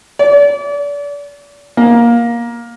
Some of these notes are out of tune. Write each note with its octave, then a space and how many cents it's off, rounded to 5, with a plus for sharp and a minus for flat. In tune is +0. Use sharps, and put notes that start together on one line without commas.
D5 -35
A#3 +15